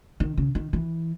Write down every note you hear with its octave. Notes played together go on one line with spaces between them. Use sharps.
D#3
C#3
D#3
E3